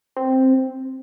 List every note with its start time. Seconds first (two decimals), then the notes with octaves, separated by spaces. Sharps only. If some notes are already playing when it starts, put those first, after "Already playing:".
0.17 C4